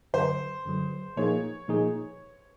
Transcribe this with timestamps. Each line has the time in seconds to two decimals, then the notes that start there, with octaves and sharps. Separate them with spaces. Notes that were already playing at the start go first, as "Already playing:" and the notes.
0.13 F#2 D3 F#3 C5
0.65 F#2 D3 F#3
1.17 A#2 F3 A#3 D#4 G#4 C#5
1.68 A#2 F3 A#3 D#4 G#4